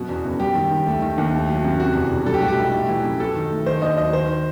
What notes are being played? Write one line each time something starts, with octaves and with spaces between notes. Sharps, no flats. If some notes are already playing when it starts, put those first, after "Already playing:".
Already playing: F#2 B2 F#4
E2
F#1
G3 G4
D#3
D#2
A3
D#3
D#2
A3
F#3
F#2
C3 F#4
E2
E1
G3 A4
G4
A2 F#4
G4
B1
A3
E3
F#2
F#3 A4
D#3
A3
D#3 C5
D#2 D#5
F#3 D#5
D#3 C5